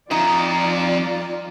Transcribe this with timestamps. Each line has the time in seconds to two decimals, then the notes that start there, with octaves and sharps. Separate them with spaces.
0.11 F2 D#4 F4 D5